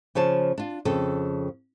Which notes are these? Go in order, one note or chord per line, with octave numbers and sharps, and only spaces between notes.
C#3 F3 C#5 A5
D4 F4
F2 C#3 A4